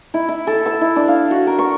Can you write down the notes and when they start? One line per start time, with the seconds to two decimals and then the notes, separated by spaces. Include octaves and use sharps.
0.14 E4
0.29 E4
0.47 A4
0.66 E6
0.81 E4
0.96 D4
1.08 F5
1.31 F#4
1.47 A#4
1.59 C#6